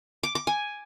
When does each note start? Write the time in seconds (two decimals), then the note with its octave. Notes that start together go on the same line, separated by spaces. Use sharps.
0.23 D6
0.35 D6
0.47 G#5